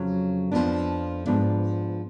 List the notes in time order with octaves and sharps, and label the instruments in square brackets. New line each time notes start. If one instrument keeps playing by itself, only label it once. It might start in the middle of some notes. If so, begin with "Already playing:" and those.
Already playing: [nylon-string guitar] F2 C#3 F#3 C#4
F2 F3 G#3 B3 D4
G#2 F3 B3 D4